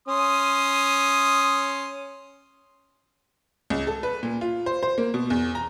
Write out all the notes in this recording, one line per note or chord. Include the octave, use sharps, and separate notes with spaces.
C#4 C6 D#6
C#2
A4
B4
A#2
F4
C5
C5
A#3
B2
E2
A#5